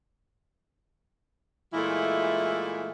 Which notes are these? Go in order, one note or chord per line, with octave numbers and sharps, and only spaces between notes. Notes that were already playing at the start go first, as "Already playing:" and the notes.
A#2 E3 G#3 A3 E4 F4